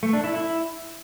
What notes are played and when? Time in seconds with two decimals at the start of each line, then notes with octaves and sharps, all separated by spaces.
0.03 A3
0.13 D4
0.24 E4
0.34 E4